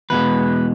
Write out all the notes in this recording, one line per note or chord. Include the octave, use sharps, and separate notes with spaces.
E2 B2 G#3 B4